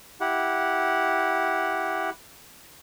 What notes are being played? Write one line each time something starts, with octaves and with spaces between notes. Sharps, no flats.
E4 G4 F#5